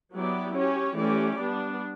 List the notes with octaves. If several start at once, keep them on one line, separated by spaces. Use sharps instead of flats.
F#3 B3 E4 G4 D5
C#4 G4 C#5
E3 A3 C#4 G4 D5
G3 B3 D4